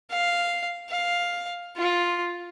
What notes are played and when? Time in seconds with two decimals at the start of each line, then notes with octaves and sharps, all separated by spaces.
0.11 F5
0.90 F5
1.77 F4